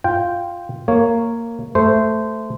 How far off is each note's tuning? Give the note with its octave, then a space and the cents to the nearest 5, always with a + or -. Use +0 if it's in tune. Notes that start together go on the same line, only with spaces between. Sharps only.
F4 +0 G5 +0
A#3 -10 C#5 +0
A3 +0 C5 -15